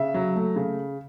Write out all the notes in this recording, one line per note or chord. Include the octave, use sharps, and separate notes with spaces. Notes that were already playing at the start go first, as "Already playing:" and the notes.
Already playing: C#3 E5
F#3
A3
C#3